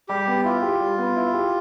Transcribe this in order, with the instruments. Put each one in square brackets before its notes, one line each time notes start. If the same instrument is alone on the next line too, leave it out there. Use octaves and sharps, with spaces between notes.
[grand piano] G3 [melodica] G4
[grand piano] B3
[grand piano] E4 [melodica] F4
[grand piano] G4
G3
B3
E4
G4